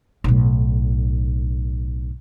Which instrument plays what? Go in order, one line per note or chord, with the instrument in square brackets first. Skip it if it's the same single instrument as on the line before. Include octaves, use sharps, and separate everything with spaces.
[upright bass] B1 A2